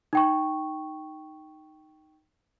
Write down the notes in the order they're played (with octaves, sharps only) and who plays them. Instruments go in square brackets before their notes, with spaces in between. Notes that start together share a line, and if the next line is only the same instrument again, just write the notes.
[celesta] D#4 G5 C#6